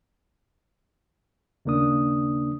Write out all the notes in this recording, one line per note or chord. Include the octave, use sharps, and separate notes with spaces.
D#2 C#3 A#3 D4 D#6